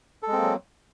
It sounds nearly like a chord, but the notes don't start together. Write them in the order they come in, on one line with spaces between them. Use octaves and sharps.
A4 G#3 C4 A#3 F#3